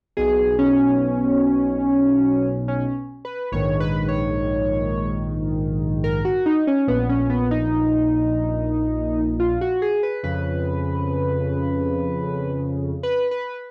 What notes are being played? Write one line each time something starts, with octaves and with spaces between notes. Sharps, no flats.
B1 B2 G#4
C#4
C#4
B4
A#1 G#2 D#3 C#5
B4
C#5
A#4
F#4
D#4
C#4
A#1 A#2 B3
C#4
B3
D#4
F4
F#4
G#4
B4
F2 C#3 B4
B4
B4